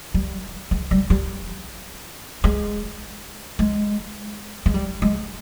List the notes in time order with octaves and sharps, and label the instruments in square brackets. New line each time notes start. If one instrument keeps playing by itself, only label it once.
[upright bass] G3
G#3
G3
G3
G#3
G#3
G#3
G3
G#3